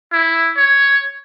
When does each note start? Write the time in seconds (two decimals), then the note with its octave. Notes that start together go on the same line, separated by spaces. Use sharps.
0.12 E4
0.56 C#5